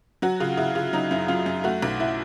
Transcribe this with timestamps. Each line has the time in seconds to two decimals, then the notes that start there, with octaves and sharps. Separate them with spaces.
0.22 F#3 F#4
0.40 C#3 F4
0.57 C#3 E4
0.75 C#3 F4
0.93 F#3 D#4
1.11 F#2 E4
1.28 F#2 F4
1.46 F#2
1.64 A3 F#4
1.83 B1
2.00 E4